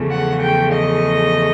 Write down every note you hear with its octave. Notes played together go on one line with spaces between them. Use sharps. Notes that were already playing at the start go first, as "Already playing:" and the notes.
Already playing: E2 C#3 F3 A3
F#5
G5
D#5